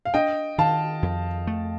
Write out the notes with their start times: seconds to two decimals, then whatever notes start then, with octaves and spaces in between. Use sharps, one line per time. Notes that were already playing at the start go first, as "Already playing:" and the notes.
0.05 F5
0.14 D4 D#5 G5
0.58 D#3 F5 A5
1.02 F2
1.47 A3